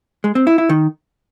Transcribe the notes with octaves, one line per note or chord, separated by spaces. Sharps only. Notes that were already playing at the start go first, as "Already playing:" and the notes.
G#3
C4
E4
E4
D#3